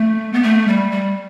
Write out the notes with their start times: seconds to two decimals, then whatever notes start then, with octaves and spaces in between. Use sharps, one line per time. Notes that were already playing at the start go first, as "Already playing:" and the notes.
Already playing: A3
0.33 B3
0.43 A3
0.67 G3
0.91 G3